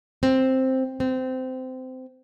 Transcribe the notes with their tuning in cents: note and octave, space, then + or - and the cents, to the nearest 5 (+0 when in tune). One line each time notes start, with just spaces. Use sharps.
C4 +5
C4 -20